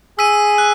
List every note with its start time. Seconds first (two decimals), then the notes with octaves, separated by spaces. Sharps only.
0.18 G#4 E6 B6 D#7
0.58 F#6